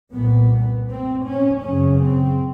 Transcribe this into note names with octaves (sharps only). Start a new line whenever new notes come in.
C2 A#2 B3
C4
C#4
F#2 C#3 C#4
C4